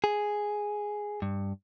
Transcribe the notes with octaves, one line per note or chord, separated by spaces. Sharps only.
G#4
G2